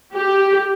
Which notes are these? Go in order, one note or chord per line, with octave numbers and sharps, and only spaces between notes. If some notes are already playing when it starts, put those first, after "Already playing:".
G4